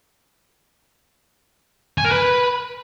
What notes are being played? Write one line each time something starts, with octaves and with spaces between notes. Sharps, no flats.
G#5
A#4
B4